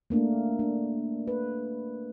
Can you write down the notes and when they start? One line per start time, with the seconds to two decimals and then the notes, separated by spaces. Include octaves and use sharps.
0.10 A3 A#3 D4
0.59 D4
1.27 B4